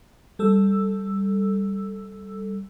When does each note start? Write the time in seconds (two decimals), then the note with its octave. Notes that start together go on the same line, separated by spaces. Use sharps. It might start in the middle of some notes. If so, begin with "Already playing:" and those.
0.39 G3 A4 E6